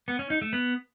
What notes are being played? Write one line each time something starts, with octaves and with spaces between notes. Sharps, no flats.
B3
C#4
D#4
A3
B3